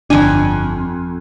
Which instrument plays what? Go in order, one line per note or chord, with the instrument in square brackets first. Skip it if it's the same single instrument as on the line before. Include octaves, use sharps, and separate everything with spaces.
[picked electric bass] G1 D4 [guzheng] F2 G#5